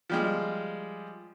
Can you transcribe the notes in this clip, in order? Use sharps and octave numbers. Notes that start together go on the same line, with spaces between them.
F3 G3 G#3